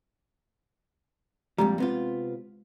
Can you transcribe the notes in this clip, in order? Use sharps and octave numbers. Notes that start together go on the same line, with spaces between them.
F2 A#2 G3 G#3 G4 A#5
C3 B3 F4